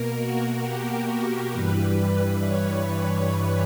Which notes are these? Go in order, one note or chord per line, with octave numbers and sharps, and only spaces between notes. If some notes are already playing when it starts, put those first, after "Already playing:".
Already playing: B2 A#3 A#4
F#4
G4
A#4
G2 E3 G3 B4
B4
C#5
B4